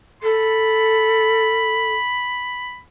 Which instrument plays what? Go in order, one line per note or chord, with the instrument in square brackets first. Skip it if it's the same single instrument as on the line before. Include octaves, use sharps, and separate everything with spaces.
[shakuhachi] A4 [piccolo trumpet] B5